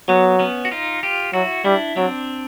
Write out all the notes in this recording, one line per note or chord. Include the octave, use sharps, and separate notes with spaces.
F#3 B3
B3 C#4
F#4
D#4 F4
F4 G4
F#3 E4 F#4
G3 D4 E4
F#3 C4 D4